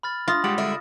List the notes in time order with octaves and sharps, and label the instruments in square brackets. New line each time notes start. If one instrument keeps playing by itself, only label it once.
[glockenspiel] B5 F6 A6
[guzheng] F4 [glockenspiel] D#6 A#6
[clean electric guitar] G3 G#3 F#5 [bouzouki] G4
[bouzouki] D3 E4